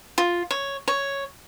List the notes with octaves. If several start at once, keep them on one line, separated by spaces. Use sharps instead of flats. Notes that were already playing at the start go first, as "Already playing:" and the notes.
F4
C#5
C#5